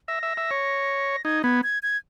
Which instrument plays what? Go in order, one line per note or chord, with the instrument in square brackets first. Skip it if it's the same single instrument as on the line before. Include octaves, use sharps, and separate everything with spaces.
[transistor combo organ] E5 [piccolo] A#6
[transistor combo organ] E5
E5
C#5
[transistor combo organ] D#4 [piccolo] G#6
[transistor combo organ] B3 [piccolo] G#6
[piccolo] G#6
G#6